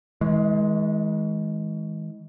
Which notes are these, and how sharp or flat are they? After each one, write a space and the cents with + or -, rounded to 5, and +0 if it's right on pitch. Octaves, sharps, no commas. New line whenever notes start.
E3 -45 G#3 +10